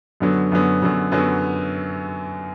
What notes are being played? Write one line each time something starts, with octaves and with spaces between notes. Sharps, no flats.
F#2 D3 F#3 B3
F#2 D3 F#3 B3
F#2 D3 F#3 B3
F#2 D3 F#3 B3